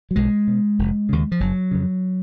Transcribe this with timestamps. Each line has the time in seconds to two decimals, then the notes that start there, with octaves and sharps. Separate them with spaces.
0.11 F#3
0.16 B1 G#3
0.47 B2
0.79 F1
1.09 D#2 C#3
1.32 F3
1.40 F#1 F#3
1.71 F2 C#3